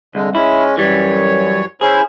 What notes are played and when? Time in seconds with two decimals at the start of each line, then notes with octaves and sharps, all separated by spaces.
0.15 C2 D3 G#3
0.35 G#3 C#4 E4
0.77 F#2 E3 G3 C#5
1.81 C#4 E4 G#4 C5